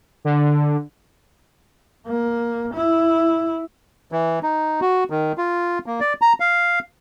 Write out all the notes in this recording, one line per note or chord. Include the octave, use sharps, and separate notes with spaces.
D3
A#3
E4
E3
D#4
F#4
D#3
F4
A#3
D5
A#5
F5